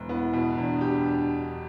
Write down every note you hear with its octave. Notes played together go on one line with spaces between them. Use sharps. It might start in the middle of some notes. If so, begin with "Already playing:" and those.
Already playing: E1
B3 E4
B2
E2 D4
G4